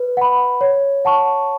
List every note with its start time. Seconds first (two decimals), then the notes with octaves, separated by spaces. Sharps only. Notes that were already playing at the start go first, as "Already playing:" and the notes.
Already playing: B4
0.17 F#5 B5
0.61 C#5
1.05 F#5 A5 C#6